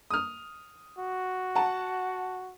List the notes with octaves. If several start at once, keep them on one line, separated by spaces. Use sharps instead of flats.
D#6 F6
F#4
F#5 A5